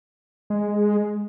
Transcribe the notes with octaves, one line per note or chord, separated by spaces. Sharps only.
G#3